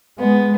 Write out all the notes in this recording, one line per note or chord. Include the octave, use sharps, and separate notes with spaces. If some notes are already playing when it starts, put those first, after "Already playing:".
G#3 B3